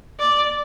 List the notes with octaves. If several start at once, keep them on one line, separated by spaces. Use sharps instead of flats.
D5